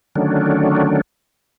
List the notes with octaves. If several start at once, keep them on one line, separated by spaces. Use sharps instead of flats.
D3 D#3 F#3 A3 C#4 D4